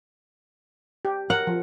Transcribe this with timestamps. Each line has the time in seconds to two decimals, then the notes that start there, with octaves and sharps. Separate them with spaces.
1.05 G4
1.30 A#4 F#5
1.47 F3